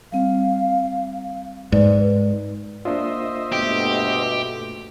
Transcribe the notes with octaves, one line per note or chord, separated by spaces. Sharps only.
G3 C4 F5
G#2 B4 D5
A#3 D4 F4 C5 D#5 E5
G2 B2 A3 G4